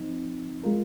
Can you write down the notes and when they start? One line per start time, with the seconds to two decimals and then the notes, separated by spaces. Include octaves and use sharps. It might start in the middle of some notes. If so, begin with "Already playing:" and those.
Already playing: F3 C4 D#4
0.64 G#3 F4 A#4